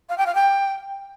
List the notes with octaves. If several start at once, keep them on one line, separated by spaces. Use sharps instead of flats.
F5
G5
F5
G5